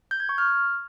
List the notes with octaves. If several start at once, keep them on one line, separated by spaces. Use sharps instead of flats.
G6
G#6
C#6
F6